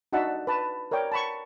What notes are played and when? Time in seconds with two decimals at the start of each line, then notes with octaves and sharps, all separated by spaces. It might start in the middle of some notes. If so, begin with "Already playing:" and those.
0.13 D4 D#4 F#4 E5 F#5 A5
0.47 B4 A5
0.91 A#4 C#5 D5 G5 D6
1.12 A5 B5 C#6